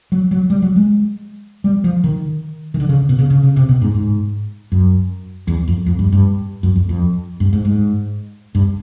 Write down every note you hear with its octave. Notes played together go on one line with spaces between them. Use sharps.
F#3
F#3
G3
F#3
G#3
G3
F3
D#3
D#3
D3
C#3
B2
C#3
C#3
C#3
C3
B2
G#2
G#2
F#2
E2
F2
F2
G2
G2
F#2
F2
F2
G2
G#2
G#2
G2